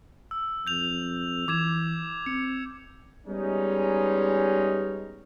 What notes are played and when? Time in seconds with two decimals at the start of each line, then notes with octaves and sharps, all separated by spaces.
0.31 E6
0.67 F2 G6 F7
1.48 E3 D6 G#6 E7
2.26 C4 C#7
3.26 G3 G#3 B3 C#4 D#4